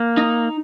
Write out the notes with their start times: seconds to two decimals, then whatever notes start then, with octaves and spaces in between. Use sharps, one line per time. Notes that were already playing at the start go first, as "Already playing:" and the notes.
Already playing: A#3
0.17 D#4